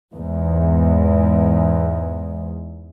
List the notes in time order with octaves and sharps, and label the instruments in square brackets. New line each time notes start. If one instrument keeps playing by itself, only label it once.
[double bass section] E2 G#2